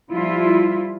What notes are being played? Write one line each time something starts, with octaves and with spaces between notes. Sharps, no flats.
F3 G3 E4 F4